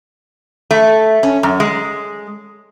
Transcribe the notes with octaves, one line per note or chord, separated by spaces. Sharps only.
A3
C#4
F#2
G#3